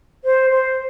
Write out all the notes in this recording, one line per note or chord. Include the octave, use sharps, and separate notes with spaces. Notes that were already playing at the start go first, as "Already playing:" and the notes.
C5
C5